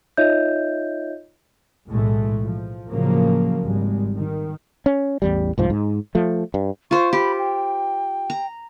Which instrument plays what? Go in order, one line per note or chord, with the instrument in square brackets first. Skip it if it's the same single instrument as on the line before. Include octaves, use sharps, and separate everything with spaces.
[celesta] D#4 F4 C#5 D#5 E5 G6
[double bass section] B1 A2 E3 G#3 A3
F3
A2 C#3 F3 F#3 A#3
G#1 G3 G#3
D#3
[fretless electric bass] C#4
A1 E2 G3
C2 G#2 F3
G#2
F3 A3
G2
[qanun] F4 C5 [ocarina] C#6
[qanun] G4 [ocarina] B5
[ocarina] G5
[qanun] A#5